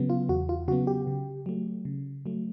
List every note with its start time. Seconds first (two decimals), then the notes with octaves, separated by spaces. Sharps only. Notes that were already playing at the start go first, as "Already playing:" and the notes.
Already playing: C#3 F#3 B3
0.10 F4
0.29 E2 F#4
0.49 F4
0.68 C#3 F#3 B3 F#4
0.87 G4
1.07 C#3
1.46 F#3 A3
1.85 C#3
2.26 F#3 A3